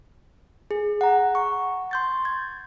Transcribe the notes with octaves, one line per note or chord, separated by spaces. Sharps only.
G#4
F#5 A#5
C#6
C6 G6 A6
G#6